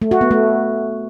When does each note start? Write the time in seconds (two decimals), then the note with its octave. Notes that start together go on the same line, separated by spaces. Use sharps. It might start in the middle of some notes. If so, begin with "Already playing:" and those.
0.02 A3
0.11 F#4
0.21 B3
0.31 A3